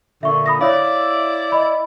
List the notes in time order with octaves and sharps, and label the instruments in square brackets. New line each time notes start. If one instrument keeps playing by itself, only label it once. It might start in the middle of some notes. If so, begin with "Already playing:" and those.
[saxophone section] A#2 D3 [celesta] E5 C#6
[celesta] B5 D#6 A#6
[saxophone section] E4 D5 [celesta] C#5 F5
[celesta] D#5 B5